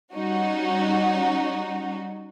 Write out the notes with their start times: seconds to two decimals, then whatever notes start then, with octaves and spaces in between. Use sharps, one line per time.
0.14 G3 C#4 D#4 F#4